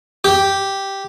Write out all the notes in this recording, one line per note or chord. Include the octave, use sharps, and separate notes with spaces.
G4